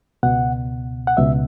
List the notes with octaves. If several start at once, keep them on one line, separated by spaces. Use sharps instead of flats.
C#2 B2 F#5
F#5
C#2 B2 E5